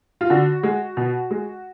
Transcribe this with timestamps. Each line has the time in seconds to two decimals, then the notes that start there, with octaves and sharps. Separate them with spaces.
0.21 F4
0.30 D3 F#4
0.63 G#3
0.97 B2
1.31 G#3